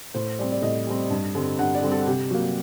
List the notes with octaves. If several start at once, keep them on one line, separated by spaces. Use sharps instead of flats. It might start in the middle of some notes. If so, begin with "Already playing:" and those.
A2 C5
G3 C4 D5
D5
A2 D#5
G3 C4
G2
D3 G3 C4
G2 F#5
D5
D3 G3 C4
A4
C3 G4
F#3 A#3 F#4